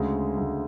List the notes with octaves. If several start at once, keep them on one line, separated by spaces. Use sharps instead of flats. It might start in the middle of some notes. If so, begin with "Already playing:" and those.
Already playing: D2 C#3 G#3
D2 C#3 G#3